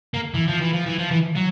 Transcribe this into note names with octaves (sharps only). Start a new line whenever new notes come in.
A#3
E3
F3
E3
F3
E3
F3
E3
F#3